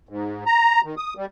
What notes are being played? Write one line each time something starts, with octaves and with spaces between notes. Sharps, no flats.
G#2
A#5
D#3
D#6
G3